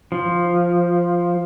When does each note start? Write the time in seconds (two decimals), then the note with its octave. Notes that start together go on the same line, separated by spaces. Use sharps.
0.12 F3